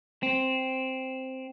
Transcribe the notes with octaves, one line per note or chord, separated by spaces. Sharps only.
C4